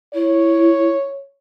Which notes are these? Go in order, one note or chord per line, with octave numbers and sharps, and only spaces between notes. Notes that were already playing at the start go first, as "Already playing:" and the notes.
E4 C#5